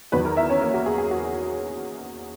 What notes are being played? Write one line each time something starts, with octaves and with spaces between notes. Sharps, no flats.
E2 D#3 F#3 B4 B5
A#4 A#5
E4 E5
C#4 C#5
A#3 A#4
F#4
G#4
G#4
F#4